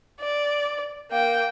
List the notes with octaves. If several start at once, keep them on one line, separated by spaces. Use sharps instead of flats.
D5
A#3 G5